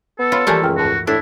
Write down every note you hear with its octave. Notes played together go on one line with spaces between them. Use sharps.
B3 A4
F4 C#5 B5
E3 F3 G3 A3 A#3 G#5 A5
C#2 F#2 G5 F6
D#2 G#2 F#4 A5
A2 D4 E4